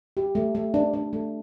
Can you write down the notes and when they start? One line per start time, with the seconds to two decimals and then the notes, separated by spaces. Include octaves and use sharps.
0.17 G4
0.35 A3
0.55 A3
0.74 D4
0.93 D4
1.13 A3